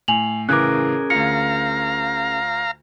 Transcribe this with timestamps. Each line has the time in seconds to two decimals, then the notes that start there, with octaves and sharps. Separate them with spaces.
0.08 A2 G#5 F7 F#7
0.49 A2 C#3 E3 C#4 G#4 A#4 D6 F#6
1.10 D2 F4 F5 A#5 C#7